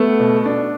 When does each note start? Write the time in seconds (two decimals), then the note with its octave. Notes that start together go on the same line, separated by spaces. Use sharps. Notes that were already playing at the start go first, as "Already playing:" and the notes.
Already playing: A3 B3
0.20 B2
0.46 D4